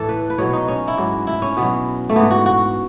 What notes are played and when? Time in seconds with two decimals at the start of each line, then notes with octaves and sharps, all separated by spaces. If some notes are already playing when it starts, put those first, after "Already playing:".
Already playing: A2 E3 A4
0.09 B4
0.30 B4
0.38 B2 F#3 C#5
0.53 D#4
0.68 C#4
0.88 E4
0.97 G#2 F#3
1.27 E4
1.42 C#4
1.57 B2 F#3 B3
2.09 A3
2.16 G#2 E3 B3
2.31 F#4
2.46 F#4